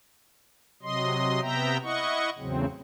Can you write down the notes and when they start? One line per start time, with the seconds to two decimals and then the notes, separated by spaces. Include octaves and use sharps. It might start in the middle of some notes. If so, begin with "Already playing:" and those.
0.82 C3 F#3 D#5 C6
1.41 C3 B3 E5 G5 A#5
1.83 E4 D#5 F#5 C#6
2.39 E2 A2 C#3 F#3 C4